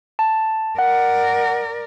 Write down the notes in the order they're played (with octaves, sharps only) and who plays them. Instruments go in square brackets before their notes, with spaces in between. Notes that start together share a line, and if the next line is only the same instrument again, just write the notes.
[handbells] A5
[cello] A#4 D5 [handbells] F#5